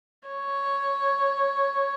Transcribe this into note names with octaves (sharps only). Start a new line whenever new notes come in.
C#5